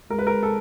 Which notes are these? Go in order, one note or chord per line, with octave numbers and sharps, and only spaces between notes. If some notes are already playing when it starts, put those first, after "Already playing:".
G#3 A#4
B4
A#4
A4